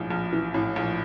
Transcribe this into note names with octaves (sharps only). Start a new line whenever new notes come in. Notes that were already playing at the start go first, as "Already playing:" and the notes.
Already playing: A#1 A2
A#1
E3
A2
A#1